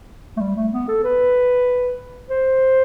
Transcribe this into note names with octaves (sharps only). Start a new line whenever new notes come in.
A3
G3
A3
B3
A4
B4
C5